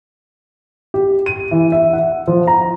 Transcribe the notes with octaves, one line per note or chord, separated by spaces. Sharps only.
G4
D#7
E3
E5
F#5
F3
A#5